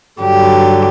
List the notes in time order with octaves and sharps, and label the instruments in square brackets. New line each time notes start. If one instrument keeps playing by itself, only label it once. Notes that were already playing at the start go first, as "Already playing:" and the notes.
[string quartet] G2 D3 F#3 G4